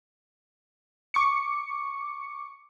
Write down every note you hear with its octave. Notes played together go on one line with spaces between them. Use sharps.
C#6 D6 C#7